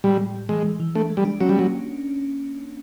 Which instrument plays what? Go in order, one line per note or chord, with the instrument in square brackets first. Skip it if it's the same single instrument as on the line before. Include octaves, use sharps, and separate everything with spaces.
[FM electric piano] A2 [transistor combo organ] G3
[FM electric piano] A2
G3
[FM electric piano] E3 [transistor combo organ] G#3
[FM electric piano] E3
E3
[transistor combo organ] A3 [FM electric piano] D4
[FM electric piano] G#3
[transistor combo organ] G3
[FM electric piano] D4
[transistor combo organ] F#3 [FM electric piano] C#4
[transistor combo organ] G3
[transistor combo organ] F#3 [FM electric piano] A#3